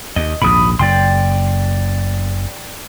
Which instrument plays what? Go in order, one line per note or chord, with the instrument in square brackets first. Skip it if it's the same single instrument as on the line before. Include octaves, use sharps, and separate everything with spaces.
[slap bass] D#2 [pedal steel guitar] D#5
[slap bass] A#1 D#2 G#2 [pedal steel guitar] B5 D#6
[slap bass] F#1 F#2 [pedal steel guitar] D5 G5 C6